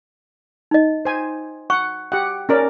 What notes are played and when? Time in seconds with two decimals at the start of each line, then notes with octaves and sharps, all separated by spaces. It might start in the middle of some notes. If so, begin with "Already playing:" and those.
0.71 D#4 D#5
1.05 C5 G#5
1.70 F#5 C#6
2.12 G4 F#5
2.49 C#4 A#4 D5